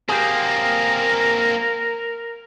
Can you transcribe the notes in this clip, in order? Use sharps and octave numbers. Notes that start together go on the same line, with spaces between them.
A#3 C4 G4 G#4 A#4